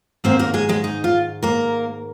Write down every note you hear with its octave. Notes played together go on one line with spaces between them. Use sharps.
G#2 D#3 A#3 C4 C5
A#3 A#4
G#3 G#4
G#3 G#4
D#4
F4
A#3 A#4